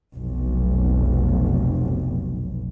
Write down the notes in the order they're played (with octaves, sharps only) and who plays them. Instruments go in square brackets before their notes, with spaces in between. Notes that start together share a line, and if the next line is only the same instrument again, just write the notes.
[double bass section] F1 B1